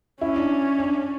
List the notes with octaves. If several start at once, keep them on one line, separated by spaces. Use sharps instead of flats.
C#4 E4
D4
D4